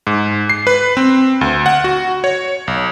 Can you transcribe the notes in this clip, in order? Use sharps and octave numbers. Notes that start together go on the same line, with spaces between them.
G#2
C7
B4
C4
D2
F#5
F#4
C#5
B1